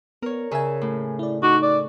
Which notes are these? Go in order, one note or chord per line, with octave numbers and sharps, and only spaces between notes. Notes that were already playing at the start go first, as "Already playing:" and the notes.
B3 A#4 C#5
C#3 A#4 E5 G#5
A2
E4 D5
D#4 F#4 D6
D5